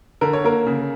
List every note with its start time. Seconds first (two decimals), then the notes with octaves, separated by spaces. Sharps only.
0.21 D3 A#4
0.33 C#5
0.44 A#3 A#4
0.66 C#3